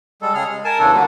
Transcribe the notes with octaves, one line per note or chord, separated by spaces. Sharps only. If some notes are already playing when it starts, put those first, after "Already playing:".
G3 G#3 A4
C#3 G#4 F6
G#3
A#4 G#5 A5
E2 C#3 D4 A4
D3 F#3 G3 A#3